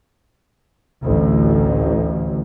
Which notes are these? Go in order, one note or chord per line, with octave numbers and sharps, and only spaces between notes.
A1 D2